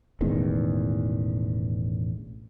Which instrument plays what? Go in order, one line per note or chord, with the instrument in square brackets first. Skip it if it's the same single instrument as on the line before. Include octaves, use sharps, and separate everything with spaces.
[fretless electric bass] E1 A1 E2 D#3